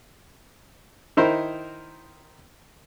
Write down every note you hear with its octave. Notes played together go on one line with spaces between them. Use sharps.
D#3 D#4 E4 A#4 C5